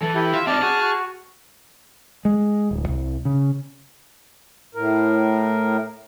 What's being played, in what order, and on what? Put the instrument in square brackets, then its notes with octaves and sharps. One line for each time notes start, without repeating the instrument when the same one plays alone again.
[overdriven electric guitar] E3 [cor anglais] A4
[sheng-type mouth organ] E4 G4
[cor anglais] F4 [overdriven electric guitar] E5
[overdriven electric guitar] C4 D#4 [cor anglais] D5 [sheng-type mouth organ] A5 F6
[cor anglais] F#4 [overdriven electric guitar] G#4
[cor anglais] F#4
[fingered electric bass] G#3
D1
C2
C#3
[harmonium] A2 A#4